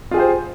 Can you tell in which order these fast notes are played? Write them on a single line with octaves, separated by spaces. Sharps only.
F4 G#4 G4 C5